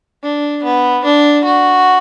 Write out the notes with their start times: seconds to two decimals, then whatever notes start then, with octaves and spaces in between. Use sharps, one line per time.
0.23 D4
0.64 B3
1.04 D4
1.44 F#4